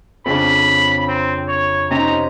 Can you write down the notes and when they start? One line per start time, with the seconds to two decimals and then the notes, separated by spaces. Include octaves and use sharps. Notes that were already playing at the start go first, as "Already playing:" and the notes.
0.26 F2 C#3 D4 B5
1.08 C4
1.48 C#5
1.90 C3 C#4 D#4 A#5